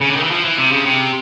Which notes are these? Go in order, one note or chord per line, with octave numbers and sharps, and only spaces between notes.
C#3
D3
D#3
E3
F3
E3
C3
C#3
C3